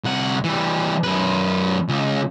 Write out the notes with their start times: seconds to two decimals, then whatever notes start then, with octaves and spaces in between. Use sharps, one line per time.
0.04 C2 F#5
0.44 E3 G3
1.04 F#2 B4
1.89 C#2